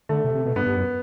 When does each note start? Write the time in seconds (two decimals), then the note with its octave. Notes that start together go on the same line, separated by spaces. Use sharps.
0.09 D3 A3
0.24 C3
0.35 C3
0.45 B2
0.56 G2 B3
0.66 G2
0.76 F#2